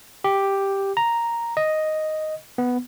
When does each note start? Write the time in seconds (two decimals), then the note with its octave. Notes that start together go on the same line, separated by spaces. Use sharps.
0.24 G4
0.97 A#5
1.57 D#5
2.58 B3